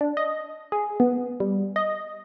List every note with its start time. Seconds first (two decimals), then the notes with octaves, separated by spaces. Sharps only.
0.01 D4
0.17 D#5
0.72 G#4
1.00 B3
1.40 G3
1.76 D#5